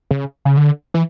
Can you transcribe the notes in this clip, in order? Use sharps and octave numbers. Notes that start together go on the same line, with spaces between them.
C#3
C#3
D3
E3